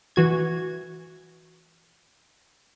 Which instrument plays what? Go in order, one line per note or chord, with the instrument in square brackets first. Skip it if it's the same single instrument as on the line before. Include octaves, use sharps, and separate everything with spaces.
[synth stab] E3 F#4 G#6